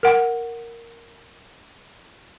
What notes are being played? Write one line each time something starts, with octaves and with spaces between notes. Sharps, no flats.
A#4 F#5